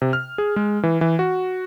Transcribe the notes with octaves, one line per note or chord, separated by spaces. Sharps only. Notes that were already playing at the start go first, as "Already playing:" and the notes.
C3
F6
G#4
G#3
E3
E3
F#4